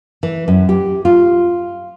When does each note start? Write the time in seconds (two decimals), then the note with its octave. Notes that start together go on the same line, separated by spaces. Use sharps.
0.23 E3
0.48 F#2
0.69 G4
1.05 F4